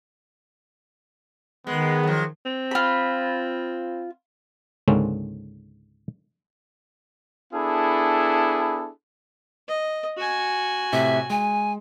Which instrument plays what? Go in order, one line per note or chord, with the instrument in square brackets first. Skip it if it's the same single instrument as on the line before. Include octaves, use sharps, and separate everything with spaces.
[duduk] D#3 [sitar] G#3 [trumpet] B3
[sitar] F3 F#3
[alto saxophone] C4
[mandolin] F4 B5
[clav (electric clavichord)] C#2 G#2 D3 A#3 C4 C#4
[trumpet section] B3 D4 E4 G#4 A4
[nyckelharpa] D#5
F#4 G#5
[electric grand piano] A2 C3 [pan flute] E5
[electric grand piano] G#3 [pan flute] G#5